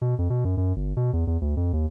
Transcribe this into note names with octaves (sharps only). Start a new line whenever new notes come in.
B2
F2
B2
F#2
F#2
G1
B2
E2
E2
D2
F2
D#2